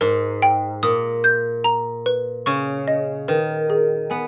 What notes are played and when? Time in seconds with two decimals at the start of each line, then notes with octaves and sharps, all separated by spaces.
0.01 G#2 A#4
0.42 G5
0.83 A#2 D#6
1.24 G6
1.64 A#5
2.06 B4
2.46 C#3 C#6
2.88 D#5
3.28 D#3 B4
3.70 G#4
4.10 B3 G#5